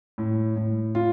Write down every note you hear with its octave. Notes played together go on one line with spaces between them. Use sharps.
A2
A2
F4